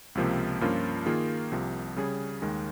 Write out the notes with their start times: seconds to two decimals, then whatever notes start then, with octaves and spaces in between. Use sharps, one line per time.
0.15 C#2 C3 F3 A#3
0.61 G2 F3 A#3 C#4 F4
1.06 D#3 A#3 F4 G#4
1.52 C2 C3 F3
1.96 C#3 G3 C#4 G#4
2.42 D#2 D#3 G#3